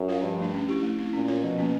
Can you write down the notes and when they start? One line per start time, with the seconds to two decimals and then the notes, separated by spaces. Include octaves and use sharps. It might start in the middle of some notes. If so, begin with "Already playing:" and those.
Already playing: F#2
0.08 F4 A#4 C#5 F5
0.23 G2 F3
0.38 A3 D4
0.53 C#4
0.68 E4 G4
0.83 A3
0.98 C4 E4
1.13 A#2 C#4
1.28 F4 A#4 C#5
1.43 B2 F3
1.58 A#3 C#4